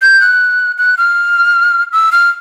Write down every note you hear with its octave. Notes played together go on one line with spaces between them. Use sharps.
G6
F#6
F#6
F6
E6
F6